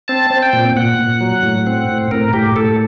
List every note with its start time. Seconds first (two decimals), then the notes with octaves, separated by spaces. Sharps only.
0.08 C4 A5
0.31 C4
0.43 G5
0.53 A#2
0.76 A#2 F#5
0.99 A#2
1.21 F#3
1.43 A2
1.67 C4
1.89 A2
2.11 A2 A#4
2.33 A2 G4
2.56 A2 A4